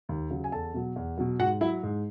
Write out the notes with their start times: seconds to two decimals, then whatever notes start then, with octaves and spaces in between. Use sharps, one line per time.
0.09 D#2
0.31 C#3 F#3
0.44 G#5
0.52 E2 A4 A5
0.74 B2 F#3
0.96 E2
1.18 B2 F#3
1.39 G#2 F#4 F#5
1.61 F#3 E4 E5
1.83 G#2